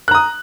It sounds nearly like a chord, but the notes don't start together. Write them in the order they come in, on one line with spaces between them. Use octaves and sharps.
F#6 A#5 D#6